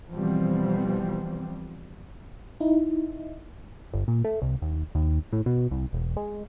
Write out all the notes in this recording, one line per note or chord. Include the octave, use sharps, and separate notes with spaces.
B2 E3 F3 G3 C4
D#4 E4
G1
A#2
A3
C2
D#2
D#2
A2
B2
C2
E1
G#3